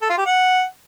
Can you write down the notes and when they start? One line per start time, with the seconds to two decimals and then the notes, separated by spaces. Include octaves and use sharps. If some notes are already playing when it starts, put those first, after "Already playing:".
0.02 A4
0.10 F4
0.18 G4
0.26 F#5